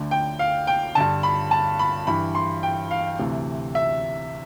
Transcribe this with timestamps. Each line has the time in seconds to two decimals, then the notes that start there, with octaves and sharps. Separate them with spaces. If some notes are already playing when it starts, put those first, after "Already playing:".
Already playing: D2 D3
0.11 G5
0.39 F5
0.67 G5
0.95 G2 D3 A5
1.23 B5
1.51 A5
1.79 B5
2.07 G2 E3 B5
2.35 C6
2.63 G5
2.91 F5
3.19 D2 C3 E3
3.75 E5